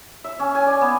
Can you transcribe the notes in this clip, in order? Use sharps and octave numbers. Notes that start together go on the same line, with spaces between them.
E5
C#4
G#5
D5
B3